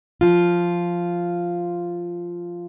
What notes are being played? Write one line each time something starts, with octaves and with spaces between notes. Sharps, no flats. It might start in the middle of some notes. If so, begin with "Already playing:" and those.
F3 F4